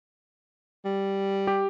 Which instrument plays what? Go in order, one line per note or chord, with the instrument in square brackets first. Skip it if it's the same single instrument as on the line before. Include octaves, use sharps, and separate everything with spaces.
[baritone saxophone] G3
[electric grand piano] G4